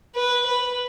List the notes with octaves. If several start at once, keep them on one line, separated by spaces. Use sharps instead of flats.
B4
B4